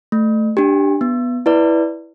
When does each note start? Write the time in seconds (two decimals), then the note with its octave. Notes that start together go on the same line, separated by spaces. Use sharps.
0.12 A3
0.57 D4 G4
1.01 B3
1.46 E4 B4 D5